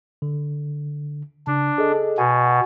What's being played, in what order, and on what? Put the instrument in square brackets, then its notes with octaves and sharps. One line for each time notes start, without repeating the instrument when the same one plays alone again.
[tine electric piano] D3
[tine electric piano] C#3 [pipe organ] D4
[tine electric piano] G#4 A4 D#5
[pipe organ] B2 [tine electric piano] F#5 G#5